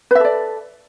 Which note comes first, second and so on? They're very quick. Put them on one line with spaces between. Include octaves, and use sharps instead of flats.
B4 E5 A4 D5